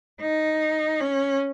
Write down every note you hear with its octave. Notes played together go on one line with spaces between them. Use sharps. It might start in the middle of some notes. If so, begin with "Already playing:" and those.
D#4
C#4